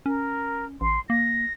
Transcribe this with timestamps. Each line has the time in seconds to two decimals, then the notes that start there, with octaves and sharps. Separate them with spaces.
0.06 C#4 A#4
0.81 A1 C6
1.10 A#3 A#6